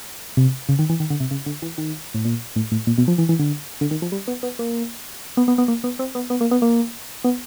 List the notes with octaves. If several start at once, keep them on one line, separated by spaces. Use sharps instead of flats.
C3
C#3
D#3
E3
D#3
D3
C3
C#3
D3
E3
D#3
A2
A#2
A2
A2
A#2
B2
F3
E3
E3
D3
D3
D#3
F3
G3
B3
B3
A#3
B3
B3
B3
A#3
B3
C4
B3
B3
A#3
B3
A#3
B3